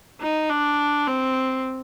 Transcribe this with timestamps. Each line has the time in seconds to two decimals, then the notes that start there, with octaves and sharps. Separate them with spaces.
0.21 D#4
0.50 D4
1.07 C4